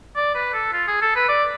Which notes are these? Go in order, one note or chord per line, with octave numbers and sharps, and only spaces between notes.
D5
B4
A4
F4
G#4
A4
B4
D5